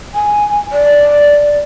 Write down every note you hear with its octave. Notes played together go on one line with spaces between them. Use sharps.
G#5
D5